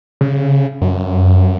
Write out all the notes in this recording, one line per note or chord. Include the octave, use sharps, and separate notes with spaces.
C#3
F#2